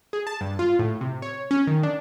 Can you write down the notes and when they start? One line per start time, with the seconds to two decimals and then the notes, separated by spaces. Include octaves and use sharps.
0.13 G#4
0.27 A5
0.41 G2
0.59 F4
0.79 A2
1.01 C3
1.22 C#5
1.51 C#4
1.67 D#3
1.83 D4